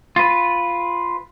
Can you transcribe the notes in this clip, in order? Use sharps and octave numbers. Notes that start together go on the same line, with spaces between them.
F4 B4